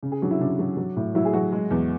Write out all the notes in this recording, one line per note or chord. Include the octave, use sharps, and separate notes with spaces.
C#3
G#4
F#3 D4
E4
C#3 D4
F#3
F#3
A2
F#3 E4
G#4
F#3 F#4
G#3
E2